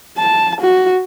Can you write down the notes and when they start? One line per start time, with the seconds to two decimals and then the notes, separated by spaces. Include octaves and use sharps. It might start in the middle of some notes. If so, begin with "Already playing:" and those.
0.18 A5
0.61 F#4